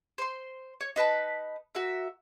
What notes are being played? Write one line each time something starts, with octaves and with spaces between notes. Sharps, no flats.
C5 C6
C#5
D#4 B4 A5 B5
F#4 A#4 E5